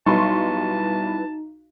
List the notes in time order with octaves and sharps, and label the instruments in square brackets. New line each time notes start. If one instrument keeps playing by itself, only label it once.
[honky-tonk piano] B1 C6 C#6 [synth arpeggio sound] G3 E4 B4 [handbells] D#4 [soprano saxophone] A5